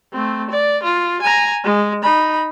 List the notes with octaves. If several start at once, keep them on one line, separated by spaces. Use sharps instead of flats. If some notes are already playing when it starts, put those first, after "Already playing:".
A3 C4
D5
F4
G#5 A#5
G#3
D#4 B5